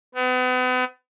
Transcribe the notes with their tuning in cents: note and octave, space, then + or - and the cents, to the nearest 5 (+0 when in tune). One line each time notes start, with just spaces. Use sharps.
B3 +40